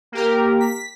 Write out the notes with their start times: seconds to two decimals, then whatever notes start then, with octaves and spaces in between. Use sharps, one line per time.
0.12 A#3 G4 A#4
0.61 B6